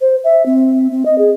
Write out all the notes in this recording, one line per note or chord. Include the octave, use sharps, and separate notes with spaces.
C5
E5
C4
C4
D#5
G#4